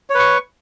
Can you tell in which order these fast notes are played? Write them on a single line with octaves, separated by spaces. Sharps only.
C#5 B4 C#6